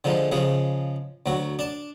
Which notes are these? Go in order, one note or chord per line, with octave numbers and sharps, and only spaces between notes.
D3 F3 G#3 D#4
C#3 F3 G#3 G#4
D2 F#3 F#4
D4 A5